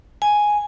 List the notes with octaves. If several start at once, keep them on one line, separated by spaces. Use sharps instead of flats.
G#5